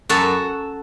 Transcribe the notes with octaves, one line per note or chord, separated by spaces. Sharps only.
F#2 F#4 A4